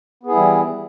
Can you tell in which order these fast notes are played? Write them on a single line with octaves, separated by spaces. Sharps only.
B3 G#4 E4 G3 E3